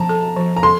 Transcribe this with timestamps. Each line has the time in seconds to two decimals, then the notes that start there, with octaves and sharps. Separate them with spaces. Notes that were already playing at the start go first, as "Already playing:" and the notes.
Already playing: F3 A5 A#5
0.09 A4
0.37 F3
0.56 A#5
0.63 A4 C6